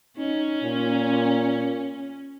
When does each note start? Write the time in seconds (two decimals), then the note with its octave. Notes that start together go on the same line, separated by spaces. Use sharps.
0.18 C#4 D#4
0.63 A#2